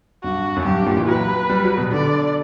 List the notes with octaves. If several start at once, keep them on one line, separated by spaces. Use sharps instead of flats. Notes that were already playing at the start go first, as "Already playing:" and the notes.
G2 F#4
F#2
G2 G4
A#2
E3
F#3 B4
G3
F#3
B2
D3 D5